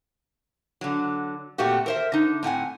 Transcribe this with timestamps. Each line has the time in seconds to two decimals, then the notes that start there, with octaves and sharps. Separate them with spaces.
0.81 D3 F#3
1.58 A#2 A3 C4 F#4 G4
1.86 A#4 C5 E5
2.12 D3 D#4
2.43 A2 C4 F#5 G#5